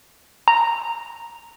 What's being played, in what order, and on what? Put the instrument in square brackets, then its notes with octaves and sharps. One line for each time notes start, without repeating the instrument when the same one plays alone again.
[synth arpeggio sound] A#5